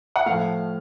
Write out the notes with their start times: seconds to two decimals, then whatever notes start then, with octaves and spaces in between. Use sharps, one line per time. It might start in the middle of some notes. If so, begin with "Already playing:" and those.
0.16 F#5
0.26 A2 F3 A3 F5